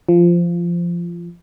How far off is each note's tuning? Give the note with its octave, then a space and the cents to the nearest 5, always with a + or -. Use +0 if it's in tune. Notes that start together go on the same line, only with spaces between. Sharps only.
F3 -15